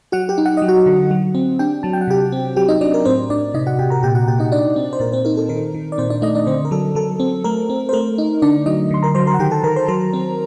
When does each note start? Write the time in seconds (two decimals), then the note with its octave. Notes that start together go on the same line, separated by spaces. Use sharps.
0.12 F#3 F#4 F#5
0.29 G4 G5
0.38 D#4
0.46 F#5
0.57 F#3 D#5
0.68 F#4 F#5
0.86 D3
1.11 F#3
1.35 C4
1.59 D4 G4 G5
1.83 F#3 A5
1.93 G5
2.01 F#5
2.08 C3 G4 G5
2.32 C4
2.56 F#3 G4 G5
2.68 D#4 D#5
2.81 F#3 D4 D5
2.94 A#4
3.05 A2 C4 C5
3.30 A2 D4 D5
3.54 C3 D#4 D#5
3.66 F#4 F#5
3.79 C3 G4 G5
3.90 A#4 A#5
4.03 A#2 G4 G5
4.15 F#4 F#5
4.27 A#2 G4 G5
4.40 D#4 D#5
4.52 D4 D#4 D5
4.76 C4
4.93 C5
5.00 A#2 A#4
5.12 C4 C5
5.25 D#4 A#4
5.37 A4
5.49 D#3 A#4
5.74 D#3
5.92 D5
5.98 A#2 C4 C5
6.10 D4 D5
6.22 A3 D#4 D#5
6.35 D4 D5
6.47 D3 C4 C5
6.65 A#4
6.71 F#3 A4
6.95 F#3 A4
7.20 C4
7.44 A3 A#4
7.70 C4
7.89 C5
7.93 A3 A#4
8.18 D#4
8.42 D3 D4 D5
8.66 F#3 D#4 D#5
8.91 D3 C6
9.02 A#4 A#5
9.15 F#3 C5 C6
9.27 A#4 A#5
9.34 F#5
9.39 D#3 G4 G5
9.51 A4 A5
9.64 D#3 A#4 A#5
9.76 C5 C6
9.88 F#3 A#4 A#5
10.13 C4